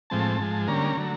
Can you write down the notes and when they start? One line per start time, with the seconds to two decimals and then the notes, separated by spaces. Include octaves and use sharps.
0.10 A2 F3 G#3 C4 A5
0.39 G#2 F3 G#3
0.68 D3 G3 A#3 C#4 A#5
0.97 D3 F#3 A3